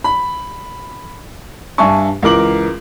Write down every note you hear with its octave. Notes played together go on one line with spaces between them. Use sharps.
B5
G2 D4 E5 G#5 A5 C#6
C#2 E3 A#4 D6 F#7